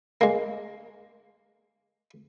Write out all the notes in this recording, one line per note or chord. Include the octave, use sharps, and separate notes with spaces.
G#3 A#3